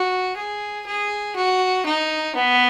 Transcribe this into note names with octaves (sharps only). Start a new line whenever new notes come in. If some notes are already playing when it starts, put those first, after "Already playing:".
Already playing: F#4
G#4
G#4
F#4
D#4
B3